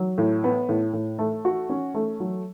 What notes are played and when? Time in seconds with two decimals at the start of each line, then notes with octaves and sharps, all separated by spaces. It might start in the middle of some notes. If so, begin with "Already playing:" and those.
Already playing: F#3
0.18 A2
0.44 B3
0.69 A2
0.93 A2
1.19 A3
1.45 F#4
1.70 C#4
1.94 A3
2.20 F#3